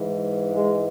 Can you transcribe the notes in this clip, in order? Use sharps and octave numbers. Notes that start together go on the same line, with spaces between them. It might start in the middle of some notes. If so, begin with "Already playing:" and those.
Already playing: G#2 E3
G#3